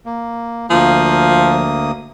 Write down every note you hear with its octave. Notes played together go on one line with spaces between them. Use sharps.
A#3
D2 F3 A#3 D#6